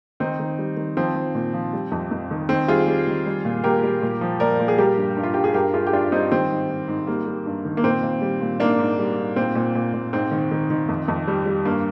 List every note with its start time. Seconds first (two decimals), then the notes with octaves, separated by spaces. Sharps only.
0.20 D#3 C4 D#4
0.40 D#3
0.59 G3
0.77 D#3
0.97 F3 C4
1.15 F3
1.35 A#2
1.54 F3
1.73 G3
1.92 F2
2.11 F2
2.31 D#3
2.49 D#3 C4
2.68 G3 F4 G#4
2.87 G3
3.07 D#3
3.26 G3
3.45 A#2
3.64 A#2 G4 A#4
3.83 G3
4.02 A#2
4.21 F3
4.40 A#2 A#4 D5
4.60 A#2
4.68 G#4
4.78 G3 G4 A#4
4.97 G2
5.17 G2
5.23 F4
5.34 G2 G4
5.44 G#4
5.54 G2 G4 A#4
5.74 G2 F4 G#4
5.87 G4
5.93 G2 D4 F4
6.12 G3 C4 D#4
6.31 D#3 C4
6.50 G#2
6.70 G#2
6.88 G#2
7.07 G3 A#3
7.27 G3
7.46 G2
7.65 D#3
7.77 A#3
7.84 A#2 C4
8.03 A#2
8.22 G3
8.41 A#2
8.60 G#2 A#3 D4
8.79 G#2
8.99 G3
9.18 G#2
9.36 A#2 C4
9.55 A#2
9.75 A#2
9.94 A#2
10.13 G#2 C4
10.31 D#3
10.51 D#3
10.71 D#3
10.89 F2
11.08 F2
11.28 G3
11.46 G3
11.65 G2 A#3